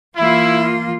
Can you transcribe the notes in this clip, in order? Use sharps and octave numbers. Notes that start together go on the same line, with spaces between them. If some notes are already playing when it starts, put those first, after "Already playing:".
E3 A#3 E4 F4